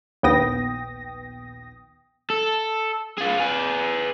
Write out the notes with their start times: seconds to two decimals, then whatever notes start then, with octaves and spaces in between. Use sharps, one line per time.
0.23 A#1 D#2 B3 G5 D#6 A#6
2.30 A4
3.18 F4 G#4
3.40 G#4 B4